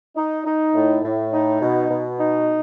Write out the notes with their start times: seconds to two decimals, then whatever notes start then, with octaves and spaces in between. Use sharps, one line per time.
0.17 D#4
0.45 D#4
0.75 A2
1.03 A2
1.33 D#4
1.62 B2
1.91 B2
2.19 D#4